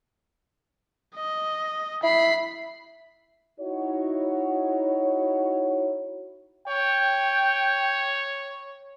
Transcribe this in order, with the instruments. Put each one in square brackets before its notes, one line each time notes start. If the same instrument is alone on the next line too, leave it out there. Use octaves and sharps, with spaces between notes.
[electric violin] D#5
[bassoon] E4 [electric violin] B5 C7
[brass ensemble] D#4 E4 F#4 C#5
[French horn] C#5 [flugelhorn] G5